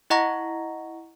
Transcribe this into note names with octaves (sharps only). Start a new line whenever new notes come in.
E4 D#5 F#5 A#5 C#6 A#6